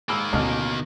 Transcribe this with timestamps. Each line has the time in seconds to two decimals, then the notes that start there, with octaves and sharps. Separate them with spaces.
0.09 G#2 D#3 A#3 B5 E6
0.33 A1 D2 B2 D#5 F6